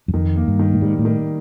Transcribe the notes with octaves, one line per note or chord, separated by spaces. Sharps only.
F#2
F2 D#3
A#3
G2
D#3
A2
G#2 G3
A2
D#3